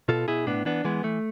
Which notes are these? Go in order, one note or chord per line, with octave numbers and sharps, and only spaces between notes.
B2 F4 A4
B2 E4 G#4
A2 B3 D4
E3 B3 D4
E3 G#3 B3
E3 A3